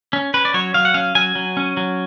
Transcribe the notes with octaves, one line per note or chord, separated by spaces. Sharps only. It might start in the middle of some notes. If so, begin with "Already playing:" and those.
C#4
C#4 B4
D5
F#3 C#5
F#3 F5
F#5
C#4 F5
F#3 G#5
F#3
C#4
F#3